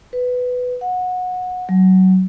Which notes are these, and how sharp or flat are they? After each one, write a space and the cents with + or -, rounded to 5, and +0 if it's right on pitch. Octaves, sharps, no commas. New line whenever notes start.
B4 +10
F#5 -20
F#3 +20